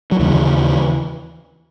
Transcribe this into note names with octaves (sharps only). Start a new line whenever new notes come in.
F#3
D#2 C#3 E3